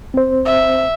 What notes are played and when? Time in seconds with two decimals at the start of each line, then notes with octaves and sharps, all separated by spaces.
0.14 C4 C5
0.45 E5